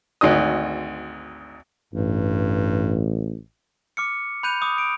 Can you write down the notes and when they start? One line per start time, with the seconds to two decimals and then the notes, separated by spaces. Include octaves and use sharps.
0.21 G#1 D2 D#3 D#5 D#6
1.93 A1 G2
3.97 D6 F6 C#7
4.43 B5 F#6 G6 D#7 F7
4.62 D6 D#6
4.78 D7